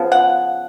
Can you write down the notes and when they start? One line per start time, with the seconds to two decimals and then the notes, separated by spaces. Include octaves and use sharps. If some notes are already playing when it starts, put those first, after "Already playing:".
Already playing: C#3 F3 B3
0.12 F#5